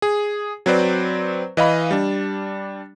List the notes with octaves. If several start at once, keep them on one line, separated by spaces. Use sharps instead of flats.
G#4
F#3 C4 B4 C5 D5
E3 D#5 F5 B5
G3 D4